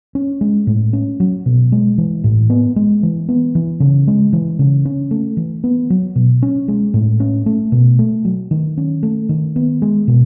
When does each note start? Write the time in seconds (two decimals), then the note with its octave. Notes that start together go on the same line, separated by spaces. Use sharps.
0.15 C#4
0.41 G#3
0.67 A2
0.93 C#4
1.20 F#3
1.46 B2
1.72 G#3
1.98 E3
2.24 A2
2.50 B3
2.76 G#3
3.03 E3
3.29 B3
3.55 E3
3.80 C#3
4.08 G#3
4.33 E3
4.59 C#3
4.85 C#4
5.11 A3
5.37 E3
5.64 B3
5.90 F#3
6.16 B2
6.42 C#4
6.68 G#3
6.94 A2
7.20 C#4
7.46 A3
7.72 B2
7.99 A3
8.25 F#3
8.51 D#3
8.77 C#4
9.03 A3
9.29 D#3
9.56 B3
9.82 G#3
10.08 B2